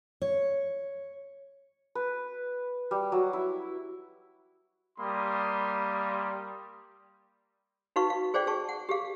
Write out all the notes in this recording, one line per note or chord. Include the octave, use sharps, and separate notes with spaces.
C#5
B4
G3
F#3
E4
G3 A#3 B5 C6 D#6
D#4 F#4 B4 F5 C#6
F5
G#4 C5 D5 F5 G5
G#4 A5 C#6
F#5
G4 G#4 F5